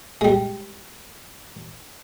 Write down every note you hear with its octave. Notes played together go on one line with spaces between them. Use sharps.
G3 G#3